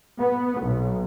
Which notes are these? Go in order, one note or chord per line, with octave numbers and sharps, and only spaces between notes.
B3
B1